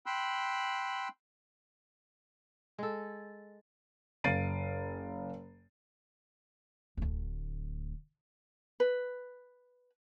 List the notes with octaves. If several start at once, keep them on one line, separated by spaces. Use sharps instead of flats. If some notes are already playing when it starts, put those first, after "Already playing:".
G5 B5 C6 E6 F#6
G#3 A4
F#1 F5 A6 C7 D7 D#7
D1 D2
B4